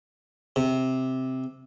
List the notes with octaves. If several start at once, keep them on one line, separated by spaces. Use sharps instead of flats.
C3